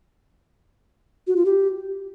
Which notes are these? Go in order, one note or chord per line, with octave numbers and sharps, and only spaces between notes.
F#4
F4
G4